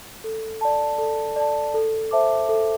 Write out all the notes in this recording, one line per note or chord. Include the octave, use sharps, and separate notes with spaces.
A4
D5 A5
A4
D5 A5
A4
C5 E5 A5 D6
A4